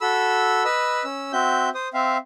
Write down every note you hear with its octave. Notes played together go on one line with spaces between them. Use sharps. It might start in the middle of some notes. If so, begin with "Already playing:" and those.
F#4 A4 B5 E6
B4 D#5 B5 E6
C#4 E6
C4 F#4 E5 G6
C5 D#6
C4 E5 F5